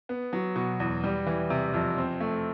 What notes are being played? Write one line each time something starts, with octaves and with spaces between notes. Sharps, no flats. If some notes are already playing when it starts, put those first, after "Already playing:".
B3
F#3
B2
E2
G3
E3
C3
F2
C4
A3